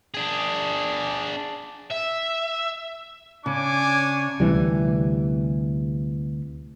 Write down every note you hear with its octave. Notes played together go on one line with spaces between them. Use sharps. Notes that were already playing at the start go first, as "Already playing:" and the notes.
D4 G#4
E5
C#3 D4 C#5 G#5 D6
D2 C3 E3 G3